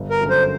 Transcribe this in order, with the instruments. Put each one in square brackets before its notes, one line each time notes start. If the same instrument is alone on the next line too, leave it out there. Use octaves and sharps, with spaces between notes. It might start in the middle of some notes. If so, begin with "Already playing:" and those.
Already playing: [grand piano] G1
[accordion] A#4
[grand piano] F#2 D3
[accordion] C5